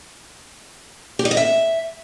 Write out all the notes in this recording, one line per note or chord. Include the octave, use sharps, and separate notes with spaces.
G4
D#4
D#5
E5